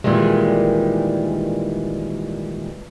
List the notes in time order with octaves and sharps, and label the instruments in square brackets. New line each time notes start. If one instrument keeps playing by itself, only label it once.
[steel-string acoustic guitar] A#2 D#3 E3 G3 G#3